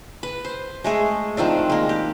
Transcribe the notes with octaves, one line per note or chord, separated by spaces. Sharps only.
B4
C5
G#3 A3 G#4
D#3 F3 C4 D4
G#3 A#3
G4